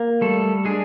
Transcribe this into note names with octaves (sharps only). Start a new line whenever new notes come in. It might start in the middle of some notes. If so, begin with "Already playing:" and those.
Already playing: A#3
G3 A3 A4
G#3 D4 G#4